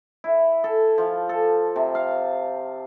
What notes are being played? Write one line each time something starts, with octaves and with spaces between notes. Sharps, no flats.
E4
A4
F3
A4
C3
F5